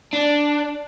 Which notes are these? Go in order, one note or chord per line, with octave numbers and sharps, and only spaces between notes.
D4